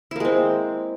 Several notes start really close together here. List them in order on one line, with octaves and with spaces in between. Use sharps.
E4 A#3 G#3 C4